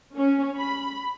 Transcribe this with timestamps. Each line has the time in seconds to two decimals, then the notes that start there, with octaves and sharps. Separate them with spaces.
0.16 C#4
0.57 B5